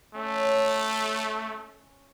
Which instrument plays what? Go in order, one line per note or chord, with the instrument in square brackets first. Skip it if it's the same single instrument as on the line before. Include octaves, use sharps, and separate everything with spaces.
[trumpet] A3 [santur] C#4